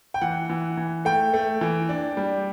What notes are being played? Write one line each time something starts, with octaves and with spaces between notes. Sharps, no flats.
G5
E3 F#5
E3
E3
A3 G5
A3
E3
D4
G3